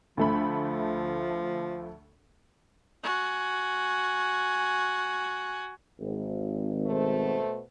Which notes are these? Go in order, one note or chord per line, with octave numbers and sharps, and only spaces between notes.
D2 F3 A3 B5
F#4 G#5
G#1
B2 A3 C5